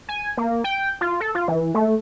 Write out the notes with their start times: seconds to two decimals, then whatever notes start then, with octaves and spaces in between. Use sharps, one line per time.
0.09 G#5
0.37 A#3
0.64 G5
1.01 F4
1.20 A4
1.35 F4
1.48 E3
1.75 A3